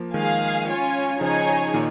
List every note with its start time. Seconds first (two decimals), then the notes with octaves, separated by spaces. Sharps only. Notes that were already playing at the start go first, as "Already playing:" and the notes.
Already playing: F3 A#3
0.14 D#3 G#3 G#4 F5 G#5
0.67 C#4 F4 C#5 G#5
1.21 C#3 F3 D#4 G#4 C#5 G#5
1.74 A#2 D#3